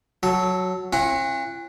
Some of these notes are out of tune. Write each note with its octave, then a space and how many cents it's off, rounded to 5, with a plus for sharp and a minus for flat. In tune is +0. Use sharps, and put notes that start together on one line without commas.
F#3 +0 A4 +0
C#4 -45 E4 +45 F#5 +0